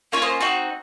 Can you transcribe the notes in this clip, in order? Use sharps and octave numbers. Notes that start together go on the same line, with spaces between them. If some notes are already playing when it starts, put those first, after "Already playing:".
A#3 C#4 F4 C#5 F5
C5 D#5
C4 D#4 F#4